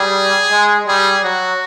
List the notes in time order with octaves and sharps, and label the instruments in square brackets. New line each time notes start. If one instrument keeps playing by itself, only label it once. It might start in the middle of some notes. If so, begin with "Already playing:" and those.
Already playing: [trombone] G3 [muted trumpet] G#4
[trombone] G#3
[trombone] G3 [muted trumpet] G#4
[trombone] F#3 [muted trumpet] F#4